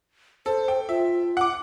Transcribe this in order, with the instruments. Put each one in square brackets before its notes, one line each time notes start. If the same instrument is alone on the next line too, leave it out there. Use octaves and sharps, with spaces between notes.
[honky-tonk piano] A4 [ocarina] C5
[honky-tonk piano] G5
[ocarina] F4 [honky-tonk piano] E5
[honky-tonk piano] F#5 D6